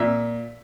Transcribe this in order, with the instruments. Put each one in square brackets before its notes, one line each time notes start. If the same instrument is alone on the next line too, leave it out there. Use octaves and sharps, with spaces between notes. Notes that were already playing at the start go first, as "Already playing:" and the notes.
Already playing: [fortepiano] A#2 E5